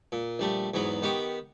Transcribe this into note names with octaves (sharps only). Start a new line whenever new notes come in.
A#2
A#1 G3 A3
E2 G#2 F#3 B3
D#3 B3 G4 C#6